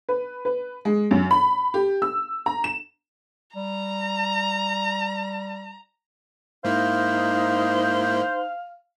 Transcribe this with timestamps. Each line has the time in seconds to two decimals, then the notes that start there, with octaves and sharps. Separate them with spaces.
0.09 B4
0.45 B4
0.85 G#3
1.11 F#2
1.31 B5
1.74 G4
2.02 E6
2.46 A#5
2.64 E7
3.56 G3 A#5
6.64 G#2 A#3 D#4 E4 C5 F5